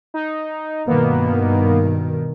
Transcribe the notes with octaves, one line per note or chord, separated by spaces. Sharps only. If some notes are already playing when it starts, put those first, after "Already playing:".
D#4
G2 B2 D#3 A#3 B3